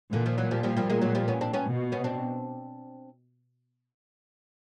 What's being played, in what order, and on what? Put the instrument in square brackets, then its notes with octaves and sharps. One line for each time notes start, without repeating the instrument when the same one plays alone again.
[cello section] A#2 [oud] D3 E3
[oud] D#3 F3
E3 F#3
F3 G3
F3 G3
F3 G3
G#3 A#3
F#3 G#3
F3 G3
B3 C#4
C4 D4
B3 C#4
[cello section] B2
[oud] B3 C#4
C4 D4